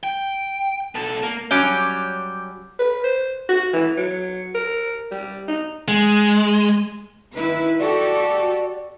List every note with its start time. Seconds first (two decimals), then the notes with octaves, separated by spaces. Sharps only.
0.03 G5
0.95 B2 A4
1.23 A#3
1.51 F#3 G3 C#4 D6 G6
2.79 B4
3.04 C5
3.49 F#4
3.73 E3
3.98 F#3
4.55 A#4
5.11 G3
5.48 D#4
5.88 G#3
7.34 D#3 E4 B4
7.79 F#4 G4 A4 D5